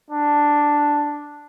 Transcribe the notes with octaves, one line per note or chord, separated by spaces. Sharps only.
D4